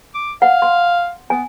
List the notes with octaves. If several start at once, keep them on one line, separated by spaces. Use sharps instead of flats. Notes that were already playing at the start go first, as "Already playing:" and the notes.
D6
F5 F#5
C6
B3 G#5